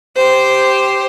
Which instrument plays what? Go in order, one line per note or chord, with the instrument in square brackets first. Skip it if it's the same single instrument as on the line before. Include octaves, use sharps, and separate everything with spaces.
[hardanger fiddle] G4 C5